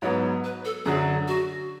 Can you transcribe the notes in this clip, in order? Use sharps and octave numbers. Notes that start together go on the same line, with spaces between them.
G#2 F#3 B3 C#5
B4
A4
F#2 D3 F#3 G#4
F#4